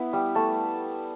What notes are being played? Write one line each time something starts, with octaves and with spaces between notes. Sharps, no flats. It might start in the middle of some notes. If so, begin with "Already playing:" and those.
Already playing: B3 E4
G3
A3 A5